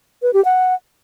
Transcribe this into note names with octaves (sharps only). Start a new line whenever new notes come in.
B4
G4
F#5